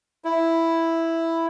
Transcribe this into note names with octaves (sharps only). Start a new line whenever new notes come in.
E4